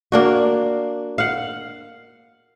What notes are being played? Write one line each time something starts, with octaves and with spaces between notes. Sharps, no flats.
A#3 D4 F#4
F5 F#5